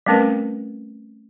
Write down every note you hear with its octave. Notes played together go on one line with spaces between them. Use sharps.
G3 A3 C4 C#4 A#4 B4